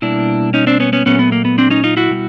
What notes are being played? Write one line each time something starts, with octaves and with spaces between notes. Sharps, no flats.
B2 G3 A#3 D4 E4
C#4 D#4
C4 D4
B3 C#4
B3 C#4
A#2 F#3 A3 B3 C#4
B3
A#3
B3
C4 D4
C#4 D#4
D#4 F4
E4 F#4
B2 G3